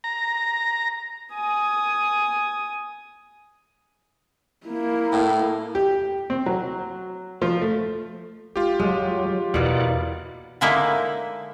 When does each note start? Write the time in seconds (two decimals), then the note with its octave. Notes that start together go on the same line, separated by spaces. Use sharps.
0.04 A#5
1.33 G#5 D#6
4.67 A#3 E4
5.13 A2
5.75 G4
6.30 C4
6.46 F#3
7.42 F3
7.62 A3
8.56 G#3 F4 G4
8.80 F2 F#3 G#3
9.54 E2 B2 A#3 E4 D5 F#5
10.61 D3 G#3 A#3 D#4 E4